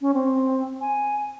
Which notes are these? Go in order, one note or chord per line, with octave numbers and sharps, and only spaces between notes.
C#4
C4
G#5